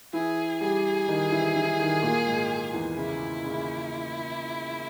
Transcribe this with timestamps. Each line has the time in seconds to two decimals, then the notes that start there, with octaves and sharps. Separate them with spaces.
0.13 E3 E4 G#4
0.60 G3 G4 G#4
1.08 D#3 D#4
1.32 E3 E4
1.56 E3 E4
1.79 D#3 D#4
2.02 A#2 A#3
2.26 G#2 G#3
2.73 E2 E3
2.97 C#3 E4
3.44 C#3